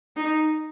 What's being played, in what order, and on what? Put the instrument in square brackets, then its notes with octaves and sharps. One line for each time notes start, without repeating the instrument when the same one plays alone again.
[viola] D#4